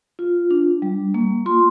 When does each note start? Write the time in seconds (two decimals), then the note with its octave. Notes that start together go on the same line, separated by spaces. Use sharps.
0.19 F4
0.51 D4
0.82 G3
1.14 A#3
1.46 F4 C6